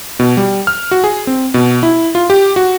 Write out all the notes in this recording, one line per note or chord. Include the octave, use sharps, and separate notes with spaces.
B2
G3
F6
F#4
G#4
C4
B2
E4
F4
G4
F#4